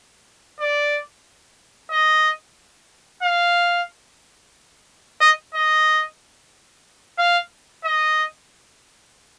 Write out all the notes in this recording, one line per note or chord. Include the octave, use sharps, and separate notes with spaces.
D5
D#5
F5
D#5
D#5
F5
D#5